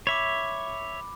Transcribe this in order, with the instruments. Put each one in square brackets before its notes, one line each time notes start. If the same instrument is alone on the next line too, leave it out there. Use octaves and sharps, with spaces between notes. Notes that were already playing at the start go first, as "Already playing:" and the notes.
[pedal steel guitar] C#5 E5 [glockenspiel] B5 D6